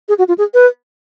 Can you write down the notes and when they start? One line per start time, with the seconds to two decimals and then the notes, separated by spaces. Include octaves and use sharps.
0.09 G#4
0.18 F#4
0.28 F4
0.38 G#4
0.54 B4